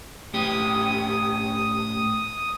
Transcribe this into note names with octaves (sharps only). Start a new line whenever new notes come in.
A2 G4 D#6